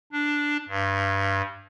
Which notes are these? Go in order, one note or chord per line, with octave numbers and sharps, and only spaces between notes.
D4
G2